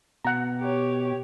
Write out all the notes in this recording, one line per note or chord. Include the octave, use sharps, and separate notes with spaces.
B2 F#5 A#5
G4 C#5